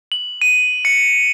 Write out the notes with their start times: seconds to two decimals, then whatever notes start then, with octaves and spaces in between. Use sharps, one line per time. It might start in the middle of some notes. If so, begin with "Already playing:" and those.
0.12 F#7
0.41 D#7
0.85 C#7